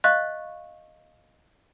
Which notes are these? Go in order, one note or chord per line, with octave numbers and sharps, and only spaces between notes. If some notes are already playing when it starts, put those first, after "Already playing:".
D#5 F5 C#6 F#6